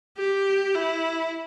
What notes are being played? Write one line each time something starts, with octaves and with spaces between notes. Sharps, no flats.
G4
E4